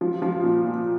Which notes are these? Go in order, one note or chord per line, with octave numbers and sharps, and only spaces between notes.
F3
F3
A#2
A#2